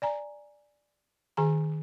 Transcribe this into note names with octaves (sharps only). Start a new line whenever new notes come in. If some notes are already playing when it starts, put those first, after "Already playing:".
D5 G#5 A#5
D#3 G#4 G#5 A#5